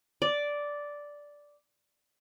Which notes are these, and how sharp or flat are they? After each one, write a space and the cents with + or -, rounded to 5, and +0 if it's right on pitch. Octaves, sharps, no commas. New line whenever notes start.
D5 -5